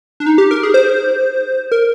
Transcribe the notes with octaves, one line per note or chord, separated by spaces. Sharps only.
D4
D#4
G4
A#4
G#4
C5
A#4